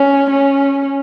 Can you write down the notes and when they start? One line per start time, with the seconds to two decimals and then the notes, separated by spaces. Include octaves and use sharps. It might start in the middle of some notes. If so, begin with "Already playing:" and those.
Already playing: C#4
0.30 C#4